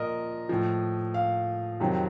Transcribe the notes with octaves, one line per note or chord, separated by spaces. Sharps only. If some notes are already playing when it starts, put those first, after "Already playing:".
Already playing: A#2 F3 A#4 D#5
A2 F3
F5
F2 C3 D#3 F#3